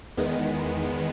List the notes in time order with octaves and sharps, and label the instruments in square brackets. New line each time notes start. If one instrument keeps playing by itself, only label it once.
[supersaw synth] E2 D#3 G#3 B3